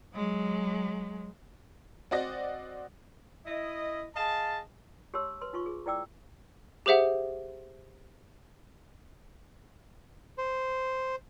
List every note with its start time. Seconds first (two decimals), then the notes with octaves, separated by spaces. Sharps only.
0.14 F#3 G#3
2.11 C4 F#4 D5 D#5 A#6
3.46 E4 D#5
4.16 G#4 D#5 F5 A5
5.14 G4 C#5 A5 C6 E6
5.42 B4 C6
5.53 D#4 F4 C6 C#6
5.66 G#4
5.86 E4 C5 D5 G5 D6 E6
6.86 G4 G#4 C5 E5 F#5
10.38 C5